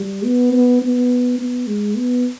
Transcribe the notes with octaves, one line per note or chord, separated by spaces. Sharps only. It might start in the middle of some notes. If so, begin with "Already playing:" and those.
Already playing: G3
B3
B3
B3
B3
G#3
B3